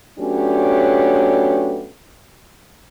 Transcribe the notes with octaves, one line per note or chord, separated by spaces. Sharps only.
F#3 A3 B3 C#4 D4 G4